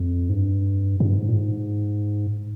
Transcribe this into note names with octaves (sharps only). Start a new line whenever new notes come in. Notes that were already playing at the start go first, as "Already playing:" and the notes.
Already playing: F2
G#2
G2
G2
G#2
A#2
G#2